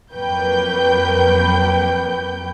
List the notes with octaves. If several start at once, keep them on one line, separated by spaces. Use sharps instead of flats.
F2 F#3 A#3 B4 G5 G6